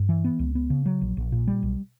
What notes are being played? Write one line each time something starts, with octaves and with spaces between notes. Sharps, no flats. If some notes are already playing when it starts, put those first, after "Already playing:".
Already playing: G2
E3
B3
C#2
B3
C#3
F#3
A#1
A#1
A#2
G3
B1